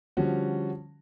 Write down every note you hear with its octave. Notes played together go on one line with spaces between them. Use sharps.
D3 F3 G3 C#4 F#4